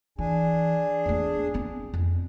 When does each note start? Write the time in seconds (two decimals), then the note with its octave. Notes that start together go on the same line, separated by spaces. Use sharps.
0.19 E3 D4 G#4
1.06 E2 A3
1.54 B3 C4
1.94 F2